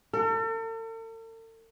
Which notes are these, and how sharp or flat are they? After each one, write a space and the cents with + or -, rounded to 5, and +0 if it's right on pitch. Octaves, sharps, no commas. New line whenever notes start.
A4 +45